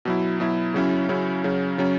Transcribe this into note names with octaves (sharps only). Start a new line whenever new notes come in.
B2 F#3 E4
B2 F#3 E4
C#3 F#3 C#4 E4
C#3 F#3 C#4 E4
C#3 F#3 C#4
C#3 F#3 C#4